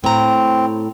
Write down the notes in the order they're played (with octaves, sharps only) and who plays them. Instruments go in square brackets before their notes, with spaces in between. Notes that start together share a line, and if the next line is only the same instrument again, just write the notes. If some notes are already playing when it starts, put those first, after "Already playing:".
[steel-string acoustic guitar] A2 A#5 [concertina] C4